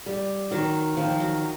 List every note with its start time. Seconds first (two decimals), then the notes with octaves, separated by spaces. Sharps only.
0.06 G3
0.51 D#3 F#3
0.97 D#3 F3
1.20 F#3